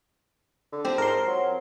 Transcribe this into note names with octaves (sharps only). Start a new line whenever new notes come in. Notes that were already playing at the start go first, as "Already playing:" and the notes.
D3
F3 C4 G4
G#2 A#4 C6
F#3